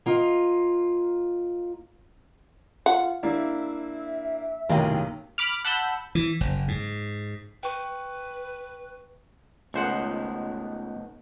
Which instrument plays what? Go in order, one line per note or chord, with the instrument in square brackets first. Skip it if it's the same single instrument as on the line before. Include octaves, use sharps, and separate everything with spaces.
[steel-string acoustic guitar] A#3 F4 D#5
[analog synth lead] F4 [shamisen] F#5
[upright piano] A#3 D4 E4 [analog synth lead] E5
[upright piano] B1 F#2 A2 [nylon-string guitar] C3 D#3 A#3 [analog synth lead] F5
[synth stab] B5 D6 F6
F#5 A5 B5 E6 G6
[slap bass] E3
F#1
G#2
[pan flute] B4 [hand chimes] G5 C#6
[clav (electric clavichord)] C#2 C5 F#5 [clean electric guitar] A3 B3 D#4